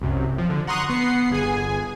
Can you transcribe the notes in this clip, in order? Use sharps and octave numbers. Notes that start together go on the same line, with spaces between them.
C2 F#2 C3
F3
D3
F#5 A#5 C6 C#6 D#6 F#6
B3 F#5 C7
G1 G#4 G#5